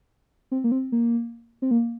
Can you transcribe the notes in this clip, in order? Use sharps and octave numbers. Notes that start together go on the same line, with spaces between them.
C4
A#3
C4
A#3
C4
A#3